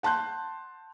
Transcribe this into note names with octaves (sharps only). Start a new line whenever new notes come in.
F#5 A5 C6 F#6 G6